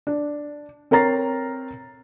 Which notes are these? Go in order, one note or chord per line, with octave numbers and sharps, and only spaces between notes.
D4
C4 A#4 C#5 A#5 A6 C7